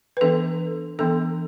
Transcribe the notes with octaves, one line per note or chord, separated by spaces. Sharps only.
B4
E3 B3 D4 A4
E3 B3 D4 A4